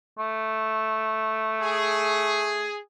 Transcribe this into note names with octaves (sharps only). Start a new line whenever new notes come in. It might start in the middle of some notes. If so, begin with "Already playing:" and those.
A3
G#4